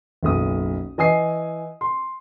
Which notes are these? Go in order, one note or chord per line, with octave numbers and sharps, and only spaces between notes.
F#1 B1 D#6
E3 D#5 G#5 D#6 C7
C6